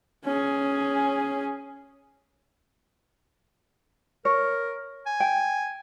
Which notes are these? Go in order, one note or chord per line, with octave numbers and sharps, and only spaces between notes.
C#4 G#4
A#4 C#5
G#5
G5